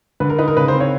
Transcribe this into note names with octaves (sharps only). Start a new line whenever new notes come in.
D3 B4
A#4
D#4 B4
A#4
C#3 B4
C5
C4
C#5